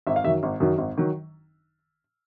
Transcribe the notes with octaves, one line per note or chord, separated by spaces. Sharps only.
G#1 E5
F5
F#2 D#3 F#3 E5
G#1
F#2 D#3 F#3
G#1
D#3 F#3